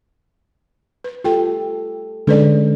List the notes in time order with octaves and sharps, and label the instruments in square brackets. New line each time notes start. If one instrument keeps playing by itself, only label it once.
[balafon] B4
[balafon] F4 G5 [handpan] G4 A4
[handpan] D3 G#3 C#4 [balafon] A4 B4 D5